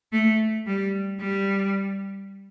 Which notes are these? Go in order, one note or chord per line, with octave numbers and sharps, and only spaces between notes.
A3
G3
G3